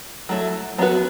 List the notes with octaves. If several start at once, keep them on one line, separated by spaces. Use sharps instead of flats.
F#3 A3 E4
F#3 B3 D4 F#4 B4